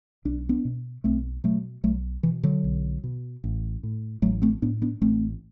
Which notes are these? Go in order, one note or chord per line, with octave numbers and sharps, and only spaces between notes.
B1 D4
B3 D4
B2
B1 A3 C4
B2 F#3 A3
B1 F#3 A3
B2 E3
D3 F#3
B1
B2
A1
A2
A1 F#3 A3
A3 C4
A2 B3 D4
B3 D4
A1 A3 C4